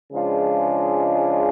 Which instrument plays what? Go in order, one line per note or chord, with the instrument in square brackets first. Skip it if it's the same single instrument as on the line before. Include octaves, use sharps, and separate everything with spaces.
[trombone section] C#3 F3 G#3 D4 F4